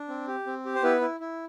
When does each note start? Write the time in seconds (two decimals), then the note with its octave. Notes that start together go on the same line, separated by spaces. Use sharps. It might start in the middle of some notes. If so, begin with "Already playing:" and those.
Already playing: D4
0.09 C4
0.28 G4
0.46 C4
0.65 G4
0.75 C5
0.83 B3 E4 B4
1.01 E4
1.20 E4